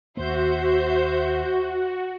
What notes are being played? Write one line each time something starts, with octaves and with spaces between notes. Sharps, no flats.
D#2 A#3 F#4 C5 E5 G6